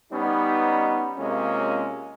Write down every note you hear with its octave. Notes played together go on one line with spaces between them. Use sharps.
G3 B3 C#4 D#4
C3 G#3 A#3 C4 C#4 F4